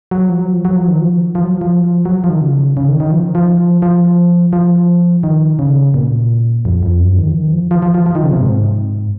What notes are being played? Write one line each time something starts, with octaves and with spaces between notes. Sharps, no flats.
F#3
F3
F#3
F3
F#3
F3
D#3
F3
F3
F#3
F3
F#3
F3
D#3
C#3
C#3
D#3
D#3
F3
F3
F3
F3
D#3
C#3
A#2
F2
F2
F#2
D#3
F3
D#3
F3
F3
F3
F3
F3
D#3
C#3
C3
G#2